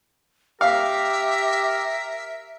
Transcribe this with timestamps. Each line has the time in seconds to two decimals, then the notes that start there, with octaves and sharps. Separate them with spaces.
0.61 G4 A#4 E5 F5